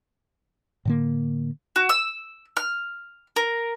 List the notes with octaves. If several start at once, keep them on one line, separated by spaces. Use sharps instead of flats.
A2 D3 A#3
F#4
E6
F6
A#4